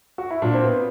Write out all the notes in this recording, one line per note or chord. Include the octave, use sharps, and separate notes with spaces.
F#4
E4
A#2 F#3 D4
C4
B3